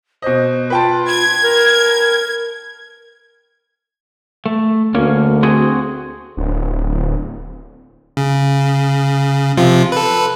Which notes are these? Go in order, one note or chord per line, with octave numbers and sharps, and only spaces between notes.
B2 C5 D#5
F4 B4 G5 A5
G#6
A#4
A3
D2 A#3 C#4
C4 F#4 G#4
D1
C#3
C3 F3 F4
A4 B4